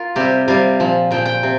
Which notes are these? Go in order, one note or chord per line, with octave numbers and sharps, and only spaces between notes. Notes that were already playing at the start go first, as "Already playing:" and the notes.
Already playing: F4 A#4
C3 G3 G4
C3 G3 F4
A#2 F3
A#2 F3 G5
G5
C3